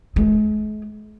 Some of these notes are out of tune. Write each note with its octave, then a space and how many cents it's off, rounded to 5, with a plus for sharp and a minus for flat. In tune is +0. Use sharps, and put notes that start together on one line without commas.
G#3 +45